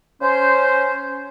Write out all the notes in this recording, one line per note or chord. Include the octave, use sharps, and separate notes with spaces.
C#4 C5